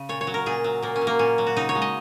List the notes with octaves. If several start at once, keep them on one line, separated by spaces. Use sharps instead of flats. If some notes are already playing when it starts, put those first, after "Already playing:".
Already playing: C#3
A#2 C#5
C#5
F#3
A#4
A#2 G#4
F#3
A#2 A#3
C#4
F#3
A#3
A#2 C#4
F#3
F#4
C#3 D#4
C#5
G#3
D#5